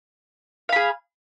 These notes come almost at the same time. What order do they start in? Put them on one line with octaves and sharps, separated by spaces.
F5 B5 G#4